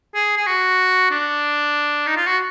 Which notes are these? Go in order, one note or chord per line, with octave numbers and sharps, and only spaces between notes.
G#4
G#4
F#4
D4
D#4
F4
F#4